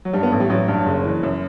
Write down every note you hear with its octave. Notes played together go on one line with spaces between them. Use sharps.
F#3
G2 G3
B3
A1 A3
G3
A1 F#3
G2
F#1
E3
F#2